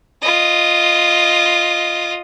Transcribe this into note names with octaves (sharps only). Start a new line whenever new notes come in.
F4 D#5